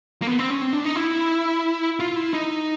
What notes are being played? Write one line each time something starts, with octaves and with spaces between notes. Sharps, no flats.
A#3
B3
C4
C#4
C4
D4
D#4
E4
F4
E4
D#4